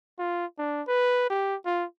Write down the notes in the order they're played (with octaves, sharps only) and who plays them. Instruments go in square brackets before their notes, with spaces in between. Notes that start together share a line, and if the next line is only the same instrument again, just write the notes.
[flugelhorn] F4
D4
B4
G4
F4